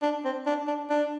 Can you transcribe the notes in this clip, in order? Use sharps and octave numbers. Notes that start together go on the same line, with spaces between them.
D4
C4
D4
D4
D4